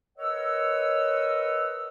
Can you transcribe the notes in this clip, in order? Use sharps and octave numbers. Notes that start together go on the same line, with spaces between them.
A#4 B4 C#5 D#5 F#5 E6